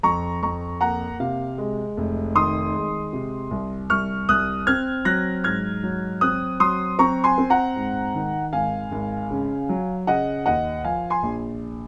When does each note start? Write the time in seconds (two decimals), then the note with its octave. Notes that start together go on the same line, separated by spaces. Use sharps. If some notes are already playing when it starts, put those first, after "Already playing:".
0.03 F2 A#5 C#6
0.43 F2 A#5 C#6
0.81 A#3 F#5 A#5
1.20 C3 F5
1.58 G#3
1.97 F1
2.35 D#3 C6 D#6
2.74 G#3
3.13 C3
3.51 C2
3.90 C2 C#6 F6
4.29 C2 D#6 F#6
4.67 C4 F6 G#6
5.05 F#3 F#6 A#6
5.44 G#2 F6 G#6
5.83 F#3
6.21 C4 D#6 F#6
6.60 F#3 C6 D#6
6.99 C4 A#5 C#6
7.24 G#5 C6
7.38 C4
7.50 F#5 A#5
7.76 G#2
8.15 D#3
8.53 G#1 F5 G#5
8.92 G#1
9.31 C#3
9.69 F#3
10.07 C#3 D#5 F#5
10.46 D#2 D#5 F#5
10.84 F3 F5 G#5
11.10 G#5 C6
11.23 A#1